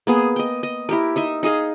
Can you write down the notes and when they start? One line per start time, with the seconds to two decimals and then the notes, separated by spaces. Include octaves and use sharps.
0.07 A#3 B3 G#4
0.36 D#5 G5
0.63 D#5
0.89 E4 G4 A#4
1.16 D#4 D#5 E5
1.43 D#4 G#4 D#5 F5